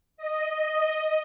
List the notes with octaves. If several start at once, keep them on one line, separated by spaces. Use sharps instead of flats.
D#5